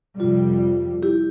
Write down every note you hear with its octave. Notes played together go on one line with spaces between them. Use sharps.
F2 C3 G3 F4
E4 G4